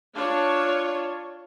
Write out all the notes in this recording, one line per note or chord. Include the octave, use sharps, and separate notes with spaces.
D4 F4 C#5